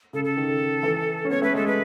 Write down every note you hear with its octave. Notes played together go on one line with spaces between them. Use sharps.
C#3 A4
A4
D#3
E3
C#4
B3 C#5
A3 B4
G#3 A4
A3 B4